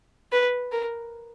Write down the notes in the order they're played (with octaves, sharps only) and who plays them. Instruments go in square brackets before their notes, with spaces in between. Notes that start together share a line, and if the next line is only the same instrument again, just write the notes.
[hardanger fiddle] B4
A#4